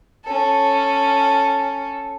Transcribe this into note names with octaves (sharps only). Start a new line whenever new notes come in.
C#4 A4